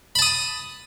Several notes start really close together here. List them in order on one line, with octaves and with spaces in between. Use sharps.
B5 A5 D#6